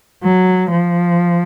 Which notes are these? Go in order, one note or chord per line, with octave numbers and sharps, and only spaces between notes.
F#3
F3